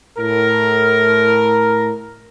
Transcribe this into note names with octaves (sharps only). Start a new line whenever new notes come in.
A2 A#4